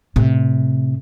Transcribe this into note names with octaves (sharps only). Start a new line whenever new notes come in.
A2 C3